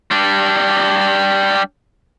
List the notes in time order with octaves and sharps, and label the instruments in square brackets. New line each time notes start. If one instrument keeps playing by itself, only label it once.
[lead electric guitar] G3 D4